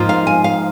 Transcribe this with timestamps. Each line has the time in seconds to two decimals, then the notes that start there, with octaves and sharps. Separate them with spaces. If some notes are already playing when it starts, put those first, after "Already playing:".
Already playing: G#2 F3 A#3 F4
0.09 F5
0.27 G#5
0.44 F5